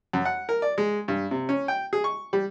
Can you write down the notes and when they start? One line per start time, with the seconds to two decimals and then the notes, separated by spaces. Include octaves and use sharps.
0.13 F#2
0.25 F#5
0.49 A#4
0.62 D5
0.78 G#3
1.08 G2
1.31 C3
1.49 C#4
1.68 G5
1.93 G#4
2.04 C#6
2.33 G3